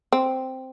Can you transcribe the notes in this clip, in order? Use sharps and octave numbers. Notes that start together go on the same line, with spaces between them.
C4